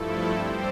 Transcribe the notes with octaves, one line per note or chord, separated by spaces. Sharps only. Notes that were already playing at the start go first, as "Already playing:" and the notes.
Already playing: G2 F3 A3 E4 A4
G3 C4 G4 C5